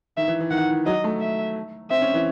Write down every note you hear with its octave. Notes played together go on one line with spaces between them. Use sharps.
D#3 E5
E3
E3
D#3 F#5
E3
F#3 D#5
A3
E5
C4 E5
C#4
E3